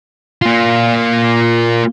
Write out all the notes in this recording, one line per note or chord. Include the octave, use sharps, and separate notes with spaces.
A#3 F4